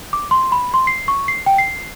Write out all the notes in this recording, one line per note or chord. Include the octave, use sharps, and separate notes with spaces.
D6
C6
B5
C6
C7
C#6
C7
G5
C7